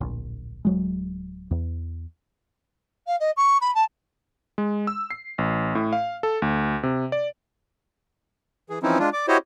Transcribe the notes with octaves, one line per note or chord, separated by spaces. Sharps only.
D1 A#1
D1 F#3 G#3
E2
F5
D#5
C#6
B5
A5
G#3
E6
C7
A1
A2
F5
A4
D2
C3
D5
E3 G#4
E3 F3 C4 C#4 D#4 E4
G#3 D4 F4
D5 D6
E4 F#4 G4 C5 C#5 D#5